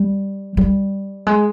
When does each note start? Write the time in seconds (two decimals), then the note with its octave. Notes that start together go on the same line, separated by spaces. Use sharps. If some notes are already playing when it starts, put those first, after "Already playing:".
Already playing: G3
0.57 G3
1.27 G#3